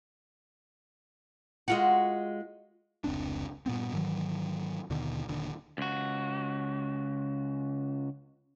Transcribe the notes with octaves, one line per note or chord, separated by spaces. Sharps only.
G#3 F4 F#4
F1 C#2 C4 D4
G2 A#2 B3 C4
G#2 D#3 E3 F#3
D#2 B2 D3 D#3
D#1 D#2 D3
C#2 F#4